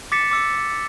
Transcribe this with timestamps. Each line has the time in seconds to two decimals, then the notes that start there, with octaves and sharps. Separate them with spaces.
0.12 D6 A6 B6 C#7 E7
0.31 D6 E6 C#7